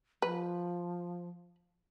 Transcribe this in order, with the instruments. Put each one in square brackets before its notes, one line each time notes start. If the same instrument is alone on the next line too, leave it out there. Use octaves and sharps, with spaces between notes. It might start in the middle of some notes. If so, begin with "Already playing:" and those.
[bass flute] F3 [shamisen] B4